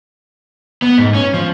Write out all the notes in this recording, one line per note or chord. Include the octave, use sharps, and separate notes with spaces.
B3
G#2
C#4
F3